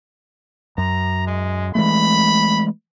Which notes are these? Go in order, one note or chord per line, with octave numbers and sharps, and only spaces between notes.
F#2 A#5
G#3
E3 G#3 A3 B5